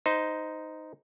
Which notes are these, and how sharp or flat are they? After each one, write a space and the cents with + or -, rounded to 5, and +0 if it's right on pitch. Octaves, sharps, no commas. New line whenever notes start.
D#4 +0 C5 -20